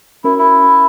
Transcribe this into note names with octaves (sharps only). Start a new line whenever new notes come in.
C#4 E4 F#4 A#4
E4